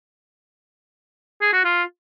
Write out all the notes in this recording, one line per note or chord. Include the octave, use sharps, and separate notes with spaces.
G#4
F#4
F4